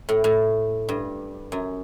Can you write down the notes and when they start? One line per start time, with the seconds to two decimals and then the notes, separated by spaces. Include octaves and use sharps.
0.09 A2
0.24 A2
0.89 G2
1.52 F#2